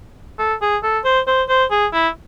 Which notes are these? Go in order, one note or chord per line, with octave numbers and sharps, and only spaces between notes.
A4
G#4
A4
C5
C5
C5
G#4
E4